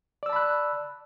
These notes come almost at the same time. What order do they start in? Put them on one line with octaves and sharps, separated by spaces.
D5 E6 A5 B5 F#6